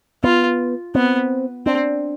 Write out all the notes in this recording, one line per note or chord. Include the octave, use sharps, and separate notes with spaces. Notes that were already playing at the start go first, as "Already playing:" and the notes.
B3 F4
B3 C4
C4 D4